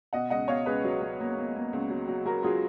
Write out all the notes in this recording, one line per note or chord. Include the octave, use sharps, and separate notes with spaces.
B2 D#5 F#5
C#2 D#5 F#5
B2 C#5 F5
C#2 G#4 B4
F#3
F#3
A#3
A#3
A#3
C#2
F#3
F#3
F#3 F#4 A#4
F#3 F4 G#4